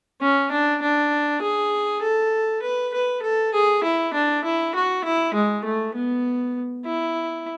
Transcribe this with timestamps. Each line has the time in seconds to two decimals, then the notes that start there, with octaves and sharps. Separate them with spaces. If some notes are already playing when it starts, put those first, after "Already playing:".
0.21 C#4
0.51 D4
0.82 D4
1.42 G#4
2.02 A4
2.62 B4
2.94 B4
3.23 A4
3.54 G#4
3.84 E4
4.14 D4
4.44 E4
4.75 F#4
5.04 E4
5.34 G#3
5.64 A3
5.95 B3
6.85 E4